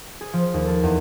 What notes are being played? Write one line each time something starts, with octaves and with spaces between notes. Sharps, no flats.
G#4
F3
D#2
A4
E2